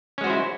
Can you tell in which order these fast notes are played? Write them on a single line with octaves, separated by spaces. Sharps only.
C#4 G#3 F#4 C5 E4